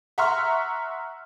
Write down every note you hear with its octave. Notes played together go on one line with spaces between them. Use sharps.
E5 F#5 A#5 C6 C#6 F6